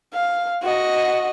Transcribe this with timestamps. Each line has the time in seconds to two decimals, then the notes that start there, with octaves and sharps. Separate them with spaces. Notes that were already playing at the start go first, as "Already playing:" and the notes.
0.14 F5
0.62 F#4 D#5